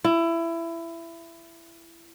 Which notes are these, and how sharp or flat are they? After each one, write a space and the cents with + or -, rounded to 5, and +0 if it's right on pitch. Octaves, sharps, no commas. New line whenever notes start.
E4 +20